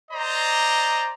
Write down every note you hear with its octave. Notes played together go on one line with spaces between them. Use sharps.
C5 D5 D#5 A#5